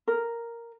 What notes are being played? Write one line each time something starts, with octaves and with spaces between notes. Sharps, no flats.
A#4